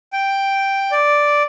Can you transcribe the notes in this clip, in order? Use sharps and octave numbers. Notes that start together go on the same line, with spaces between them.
G5
D5